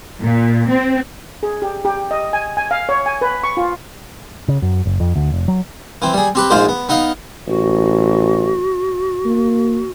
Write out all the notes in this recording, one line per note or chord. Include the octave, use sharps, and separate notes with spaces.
A#2
C4
G#4
G4
G4
D#5
G#5
G#5
F5
C#5
G#5
B4
C#6
F4
C#3
F#2
F#1
F2
D2
F1
F#3
E3 C4
G3 G#4
C4 G4 B4
A#1 G#2 G#3 F4 C5 D#6
B3
B3 D#4 D#5 F5
A1 F#4
A#3